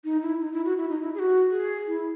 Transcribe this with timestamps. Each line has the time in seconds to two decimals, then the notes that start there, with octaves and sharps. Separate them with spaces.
0.05 D#4
0.22 E4
0.41 D#4
0.53 E4
0.65 F#4
0.77 E4
0.90 D#4
1.01 E4
1.14 G#4
1.19 F#4
1.51 G#4
1.87 E4